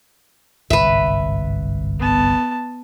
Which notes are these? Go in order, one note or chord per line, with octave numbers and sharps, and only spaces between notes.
G1 C2 G#2 B4 E5
B3 A5